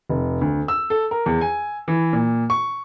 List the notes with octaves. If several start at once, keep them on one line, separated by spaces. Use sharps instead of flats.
F1
D2
E6
A4
A#4
E2
G#5
E3
A#2
C#6